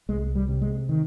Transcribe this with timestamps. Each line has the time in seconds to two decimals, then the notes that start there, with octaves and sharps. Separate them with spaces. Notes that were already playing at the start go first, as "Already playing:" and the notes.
0.09 C2 G#3
0.35 G3
0.48 C3
0.61 G#3
0.89 D#3